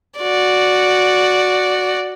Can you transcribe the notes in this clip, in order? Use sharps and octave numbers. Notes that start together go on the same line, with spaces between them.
F#4 D5